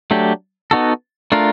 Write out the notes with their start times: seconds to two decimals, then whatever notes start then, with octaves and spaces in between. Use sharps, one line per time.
0.11 F#3 A3 D4 G4
0.71 B3 D#4 F#4 A4
1.32 A3 D4 F4 A#4